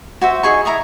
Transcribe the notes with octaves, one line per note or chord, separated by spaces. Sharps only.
F#4 C5 E5
D#4 G#4 G#5 C#6
E4 A#5 C#6 D#6